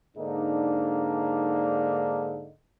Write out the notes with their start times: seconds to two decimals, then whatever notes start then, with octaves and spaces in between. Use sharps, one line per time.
0.17 G#2 D3 A#3 D4 D#4